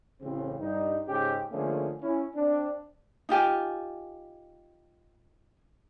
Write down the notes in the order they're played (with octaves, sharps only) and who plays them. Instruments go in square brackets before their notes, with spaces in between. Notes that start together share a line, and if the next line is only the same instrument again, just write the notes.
[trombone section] A1 C#3 C4
G2 D#4
G#2 C#3 C#4 G4
D3 F3 A3 A#3 C#4 G#4
C#4 E4
C4 D4
[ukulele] D#4 F4 G4 G#5